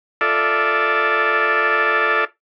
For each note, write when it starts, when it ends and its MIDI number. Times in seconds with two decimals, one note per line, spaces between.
0.21 2.25 65
0.21 2.25 69
0.21 2.25 74
0.21 2.25 76